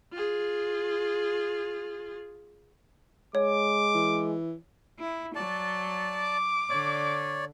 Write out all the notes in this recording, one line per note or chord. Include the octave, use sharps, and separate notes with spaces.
F4 G#4
G#3 C#5 D6
E3
E4
F#3 D5 A5
D6
D3 C#5 D5